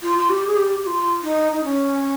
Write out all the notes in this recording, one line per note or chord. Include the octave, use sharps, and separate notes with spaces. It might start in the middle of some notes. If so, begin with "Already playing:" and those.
F4
F4
G4
G#4
G4
G4
F4
D#4
D#4
C#4